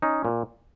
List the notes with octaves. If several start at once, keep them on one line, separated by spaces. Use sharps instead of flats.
C#4 D#4
A#2